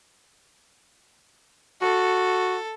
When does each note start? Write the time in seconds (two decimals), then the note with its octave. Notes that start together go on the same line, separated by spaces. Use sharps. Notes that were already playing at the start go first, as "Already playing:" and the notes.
1.82 F#4 A4